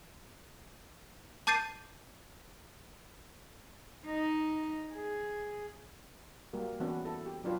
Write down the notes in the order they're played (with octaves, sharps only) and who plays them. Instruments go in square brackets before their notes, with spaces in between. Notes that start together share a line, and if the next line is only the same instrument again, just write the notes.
[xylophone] A5 D6 G6 A6 C7 D#7
[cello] D#4
G#4
[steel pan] G3 A#3 F#4 A#4
E3 B3 C#4 D4 F#4
E4 A4
G4
F#3 D4 F4 B4